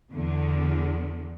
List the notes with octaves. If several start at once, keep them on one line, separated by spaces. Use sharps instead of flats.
E2 D3